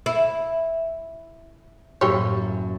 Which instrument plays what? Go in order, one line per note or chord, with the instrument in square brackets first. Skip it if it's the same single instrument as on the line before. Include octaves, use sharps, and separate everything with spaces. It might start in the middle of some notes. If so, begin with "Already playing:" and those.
[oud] E4
[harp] F#2 A2 A#3 [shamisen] E3 G4 C#5